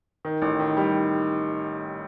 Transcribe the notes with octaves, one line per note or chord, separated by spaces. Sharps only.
D#3
A1
D#3
G3